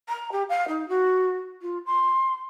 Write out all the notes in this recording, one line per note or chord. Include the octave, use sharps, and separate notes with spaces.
A#5
G4
F5
D#4
F#4
F4
C6